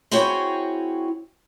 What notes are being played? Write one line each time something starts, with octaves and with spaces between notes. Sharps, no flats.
C4 E4 F#4 G#4 C#5 G5